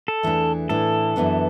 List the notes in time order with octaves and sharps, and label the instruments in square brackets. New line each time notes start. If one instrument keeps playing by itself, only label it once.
[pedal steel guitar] A4
[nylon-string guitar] E2 E3 A3 D4
[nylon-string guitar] A2 E3 D4 [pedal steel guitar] A4
[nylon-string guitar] F#2 E3 B3 D4